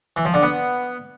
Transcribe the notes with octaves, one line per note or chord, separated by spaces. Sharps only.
E3
F3
D3
B3